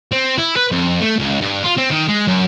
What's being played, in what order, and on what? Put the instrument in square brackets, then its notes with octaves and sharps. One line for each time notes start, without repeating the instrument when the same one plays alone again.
[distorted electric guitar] C4
E4
B4
F2
A3
C#2
G2
F4
C4
D#3
G#3
F#2